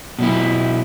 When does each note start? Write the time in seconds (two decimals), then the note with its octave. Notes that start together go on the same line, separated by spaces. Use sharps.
0.19 B2 F#3 E4